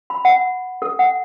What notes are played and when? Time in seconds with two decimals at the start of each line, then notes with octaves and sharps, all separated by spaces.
0.10 B5
0.25 F#5
0.82 A4
0.99 F#5